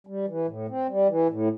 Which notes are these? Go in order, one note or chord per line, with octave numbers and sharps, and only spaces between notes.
G3
E3
A2
C4
G3
E3
A2